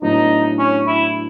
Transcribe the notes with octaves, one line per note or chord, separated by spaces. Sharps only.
A2 F#3 B3 D4 D#4
C#4
E4